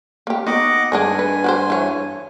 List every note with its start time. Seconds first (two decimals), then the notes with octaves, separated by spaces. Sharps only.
0.27 A#3 G4
0.47 B3 D#4 F#4 D#5 F#5 D6
0.92 G2 D#3 G#3 D4 G#5
1.19 B4
1.44 F#4 G4 C5
1.70 E3 C#5